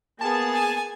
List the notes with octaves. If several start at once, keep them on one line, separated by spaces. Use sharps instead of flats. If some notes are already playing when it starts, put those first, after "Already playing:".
A#3 B3 G#4 A5
G#5